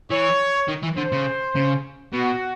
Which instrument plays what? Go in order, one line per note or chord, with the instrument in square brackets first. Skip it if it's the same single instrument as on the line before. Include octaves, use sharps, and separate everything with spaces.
[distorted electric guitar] E3 [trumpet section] C#5
[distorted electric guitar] D#3
E3
[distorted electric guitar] D3 [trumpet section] C5
[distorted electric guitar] C#3
C#3
[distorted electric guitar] B2 [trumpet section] F#4